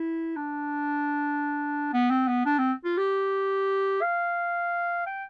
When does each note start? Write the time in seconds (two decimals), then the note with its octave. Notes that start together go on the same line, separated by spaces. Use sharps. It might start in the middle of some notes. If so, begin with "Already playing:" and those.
Already playing: E4
0.36 D4
1.93 B3
2.10 C4
2.28 B3
2.46 D4
2.58 C4
2.84 F4
2.97 G4
4.02 F5
5.06 G5